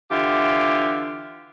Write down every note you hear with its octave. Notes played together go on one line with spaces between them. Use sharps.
D3 E3 F4 G4